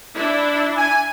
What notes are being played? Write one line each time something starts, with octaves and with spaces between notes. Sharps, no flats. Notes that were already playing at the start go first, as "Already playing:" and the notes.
D4 E4
G#5